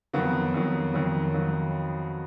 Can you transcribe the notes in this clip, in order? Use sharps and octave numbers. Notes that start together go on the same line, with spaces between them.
F2 D#3 F#3 B3
F2 D#3 F#3
F2 D#3 F#3
D#3 F#3